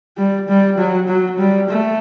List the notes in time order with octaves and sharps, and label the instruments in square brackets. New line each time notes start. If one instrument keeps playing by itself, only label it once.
[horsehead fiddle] G3
G3
F#3
F#3
G3
A3